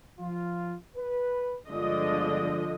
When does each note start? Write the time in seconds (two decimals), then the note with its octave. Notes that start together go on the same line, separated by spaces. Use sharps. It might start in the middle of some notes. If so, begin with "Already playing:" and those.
0.19 F3 F4
0.96 B4
1.69 G1 D3 F3 G#3 D5 D#5